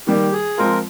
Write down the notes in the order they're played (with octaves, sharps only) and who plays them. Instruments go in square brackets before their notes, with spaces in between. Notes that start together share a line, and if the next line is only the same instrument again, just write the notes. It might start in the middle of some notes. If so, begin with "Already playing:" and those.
[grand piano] D#3 G3 A#3 [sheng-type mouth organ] G4
[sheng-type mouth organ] G#4
[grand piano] F3 G#3 C4 F4 [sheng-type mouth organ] A#4